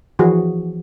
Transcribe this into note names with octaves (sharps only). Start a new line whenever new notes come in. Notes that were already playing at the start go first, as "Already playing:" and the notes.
E3 F3 F#4 G#4